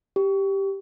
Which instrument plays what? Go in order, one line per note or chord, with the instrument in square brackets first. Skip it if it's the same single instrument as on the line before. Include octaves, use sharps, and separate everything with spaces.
[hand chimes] G4